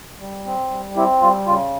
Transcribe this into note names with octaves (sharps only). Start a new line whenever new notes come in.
G3
C4
G3
C4 E4 G4
G3 F4
C#3 F4